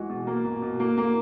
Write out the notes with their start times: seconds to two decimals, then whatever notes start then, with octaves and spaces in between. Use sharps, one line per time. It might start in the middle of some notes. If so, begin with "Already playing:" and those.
Already playing: E3 G#3 F#4
0.09 B2
0.27 A#3
0.45 B2
0.62 B2
0.80 A#3
0.98 A#3